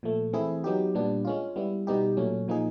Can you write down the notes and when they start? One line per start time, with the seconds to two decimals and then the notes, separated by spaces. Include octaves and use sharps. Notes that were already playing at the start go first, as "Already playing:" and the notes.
0.03 A#2 F3 A3
0.33 E3 A3 C4 E4 G#4
0.64 F#3 B3 D#4 G4
0.95 A#2 G3 B3 D4
1.25 G#3 C#4 F4
1.56 G3 B3 E4
1.87 B2 G3 B3 D#4 G4
2.17 A#2 F#3 A3 C#4
2.48 A#2 F3 A#3 D#4 G#4